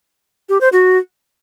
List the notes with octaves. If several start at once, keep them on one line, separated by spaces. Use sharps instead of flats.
G4
C5
F#4